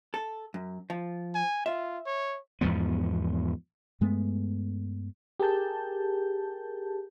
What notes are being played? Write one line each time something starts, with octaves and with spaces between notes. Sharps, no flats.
A4
F#2
F3
G#5
F4 E5
C#5
E2 G#2 F3 B3
G2 G#3 A3 B3
G4 G#4 A#4 A5 G6